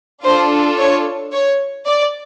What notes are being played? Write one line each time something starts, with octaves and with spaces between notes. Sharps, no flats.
D4 F4 A4 C5
C#5
C#5
D5